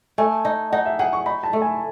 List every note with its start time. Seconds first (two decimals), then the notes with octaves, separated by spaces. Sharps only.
0.18 A3 G#5
0.45 D#4
0.72 D#4 F#5
0.86 E5
0.99 G#4 F#5
1.13 C#6
1.26 D#4 B5
1.43 A5
1.53 A3
1.62 G#5